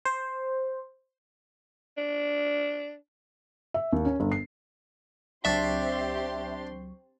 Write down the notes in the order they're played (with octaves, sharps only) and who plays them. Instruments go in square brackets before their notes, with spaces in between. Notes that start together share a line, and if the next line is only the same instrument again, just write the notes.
[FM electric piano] C5
[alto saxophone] D4
[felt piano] E5
D#2
C#4
G1
C7
[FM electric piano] C#2 F#3 C#6 [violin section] C4 G4 C6 [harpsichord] D4 [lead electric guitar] E5